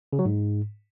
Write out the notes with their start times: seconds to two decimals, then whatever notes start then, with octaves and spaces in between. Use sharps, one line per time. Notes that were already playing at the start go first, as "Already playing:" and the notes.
0.13 C#3
0.19 F#3
0.25 G#2